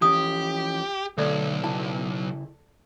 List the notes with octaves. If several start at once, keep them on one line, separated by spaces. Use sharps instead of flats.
E3 F3 C#4 G4 D#6
B1 D3 A3 A4 D5
C#3 E4 A5